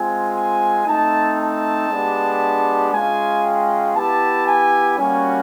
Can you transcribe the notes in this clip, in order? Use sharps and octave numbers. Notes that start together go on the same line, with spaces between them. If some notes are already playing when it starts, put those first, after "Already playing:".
Already playing: G#3 C4 F4 G#5
G#5
A3 C4 D#4 A5
A5
G#3 B3 D4 G4
G#3 C#4 F4 G#5
G5
B3 E4 G4 A5
G#5
G3 A#3 C#4 F#4 G#5